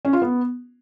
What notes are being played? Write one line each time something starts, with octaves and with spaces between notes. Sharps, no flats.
C#4
F4
B3